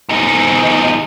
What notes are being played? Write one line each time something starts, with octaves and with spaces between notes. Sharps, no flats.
E2 D#4